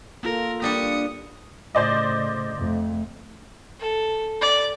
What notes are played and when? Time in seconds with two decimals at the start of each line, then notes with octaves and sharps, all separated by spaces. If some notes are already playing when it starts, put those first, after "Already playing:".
0.23 A#3 F4 A4 A#4
0.62 G3 A#3 D4 G4 D#6 C#7
1.75 A2 C#3 C5 D5 D#5
2.56 F2 A3
3.80 A4
4.42 D5